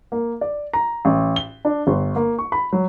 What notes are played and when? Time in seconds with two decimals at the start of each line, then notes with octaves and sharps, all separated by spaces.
0.12 A#3
0.41 D5
0.73 A#5
1.05 A1
1.36 G7
1.65 D4
1.87 G1
2.16 A#3
2.39 C#6
2.52 B5
2.73 F#3